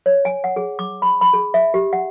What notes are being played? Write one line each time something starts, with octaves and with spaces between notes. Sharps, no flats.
C#5
G#5
F#5
G#4
D6
B5
B5
G#4
E5
G4
F#5